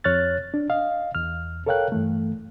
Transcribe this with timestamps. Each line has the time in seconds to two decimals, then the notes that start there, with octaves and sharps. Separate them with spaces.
0.04 F2 C#5 F6 F#6 A6
0.54 D4
0.70 D#5 F5
1.15 E2 F6
1.66 A4 A#4 C#5 F5 G5 F#6
1.92 G2 E3 A3